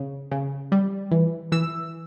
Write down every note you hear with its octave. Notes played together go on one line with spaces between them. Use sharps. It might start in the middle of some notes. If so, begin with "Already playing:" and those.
Already playing: C#3
C#3
G3
E3
E3 E6